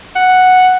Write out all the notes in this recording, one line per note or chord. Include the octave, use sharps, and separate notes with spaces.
F#5